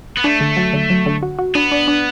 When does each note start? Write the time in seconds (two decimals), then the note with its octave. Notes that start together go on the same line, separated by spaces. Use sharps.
0.17 B3
0.24 A3 D4
0.41 D3
0.57 F#3
0.73 D3
0.90 F#3
1.06 D3
1.23 F#4
1.39 F#4
1.55 B3 D4
1.72 D4
1.88 D4